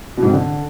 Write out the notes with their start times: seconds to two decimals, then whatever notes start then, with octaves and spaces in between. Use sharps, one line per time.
0.17 B2
0.23 G#2
0.28 C4
0.33 D3